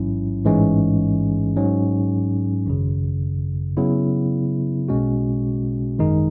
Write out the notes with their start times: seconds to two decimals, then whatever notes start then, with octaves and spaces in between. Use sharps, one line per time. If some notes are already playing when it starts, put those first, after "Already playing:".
Already playing: A1 G#2 F#3 C#4 E4
0.44 A1 G#2 E3 G#3 C#4
1.56 G#2 F#3 C#4
2.66 G#1 F#2 C#3
3.77 C#3 F#3 B3 E4
4.89 B1 B2 G#3 C#4 F#4
5.98 G#1 F#2 D#3 G#3 D#4